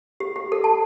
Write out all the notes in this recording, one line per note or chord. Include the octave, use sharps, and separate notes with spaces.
G4
G4
A4
A5